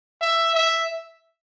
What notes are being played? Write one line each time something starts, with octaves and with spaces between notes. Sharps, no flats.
E5
E5